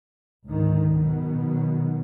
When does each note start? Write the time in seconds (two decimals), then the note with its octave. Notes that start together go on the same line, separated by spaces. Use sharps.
0.46 C#2 G#2 D3 D#3
0.97 B2 D#3 F#3 B3